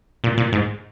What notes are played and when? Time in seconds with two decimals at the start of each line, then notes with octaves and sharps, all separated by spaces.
0.24 A#2
0.38 A#2
0.53 G#2